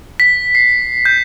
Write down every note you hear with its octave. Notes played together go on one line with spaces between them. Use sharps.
B6
C7
G6